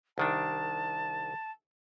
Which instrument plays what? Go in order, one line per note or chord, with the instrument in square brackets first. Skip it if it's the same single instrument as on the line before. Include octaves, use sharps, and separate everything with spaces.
[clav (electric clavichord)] C2 D#3 D4 [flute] A5